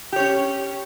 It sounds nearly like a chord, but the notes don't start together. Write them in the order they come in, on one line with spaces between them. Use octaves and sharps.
G4 C#5 C#4